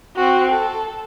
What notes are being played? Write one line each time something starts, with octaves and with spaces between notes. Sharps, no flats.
C4 F#4
A4